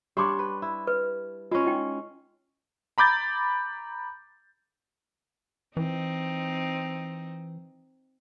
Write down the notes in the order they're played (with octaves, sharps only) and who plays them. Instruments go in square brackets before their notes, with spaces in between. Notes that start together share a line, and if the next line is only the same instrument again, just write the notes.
[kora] G3 D4 C#5 [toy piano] G4 C6 D6
[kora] B4
E4
[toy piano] B4
[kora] G#3 C#4 [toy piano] F4
[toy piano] D#4 E4 G5
[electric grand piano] A#5 B5 D6 G6 A6
[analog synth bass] E3 [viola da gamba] C4 D#4